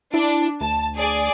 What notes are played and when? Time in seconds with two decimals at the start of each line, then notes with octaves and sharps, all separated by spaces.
0.14 D4 E4
0.61 D2 A5
0.96 G#4 D5